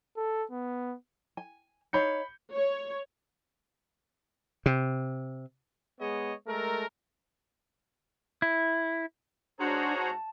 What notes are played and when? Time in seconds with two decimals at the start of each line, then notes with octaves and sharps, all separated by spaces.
0.17 A4
0.51 B3
1.37 G#5
1.93 D#4 C#5 F5 B5 G6 C#7
2.54 C#5
4.66 C3
6.00 G#3 B3 G#4 C#5 D#5
6.47 G#3 A3 A4 A#4
8.42 E4
9.60 G#2 D4 F#4 G#4 C5 C#5 A#5
9.98 A5